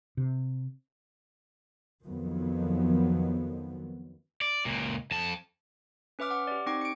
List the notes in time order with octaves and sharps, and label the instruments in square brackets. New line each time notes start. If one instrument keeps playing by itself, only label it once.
[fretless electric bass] C3
[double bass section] F2 D#3 F3 F#3 B3
[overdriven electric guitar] D5
C#2 A#2
F2 A5
[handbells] C#4 B4 E5 D6 F6
F#5 D6
G4 D5
C4 D#4 G5 C#6 D6
C#7 D7